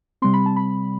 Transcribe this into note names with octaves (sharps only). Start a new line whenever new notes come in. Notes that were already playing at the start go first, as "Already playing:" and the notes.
C3 G3 C4 C6
B5
A5
B5